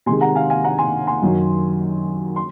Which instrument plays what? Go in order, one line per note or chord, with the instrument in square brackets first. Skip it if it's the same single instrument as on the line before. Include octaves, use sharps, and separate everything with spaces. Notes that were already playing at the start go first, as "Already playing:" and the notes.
[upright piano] C3 D#3 G#3 G#5 C6
F#5 A#5
F5 G#5
F5 G#5
F#5 A#5
G#5 C6
G#5 C6
F#2 D#3 F#3
C6